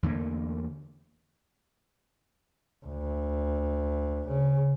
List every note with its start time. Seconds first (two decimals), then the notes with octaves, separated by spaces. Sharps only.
0.03 E2 D3 A3 A#3
2.86 D2
4.28 C#3